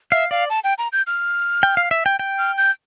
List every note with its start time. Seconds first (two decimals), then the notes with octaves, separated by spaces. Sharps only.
0.12 E5 F5
0.31 D5 F5
0.50 A5
0.64 G5
0.78 A#5
0.92 G6
1.07 F6
1.63 G5
1.77 F5
1.91 E5
2.06 G5
2.19 G5
2.39 F6
2.58 G6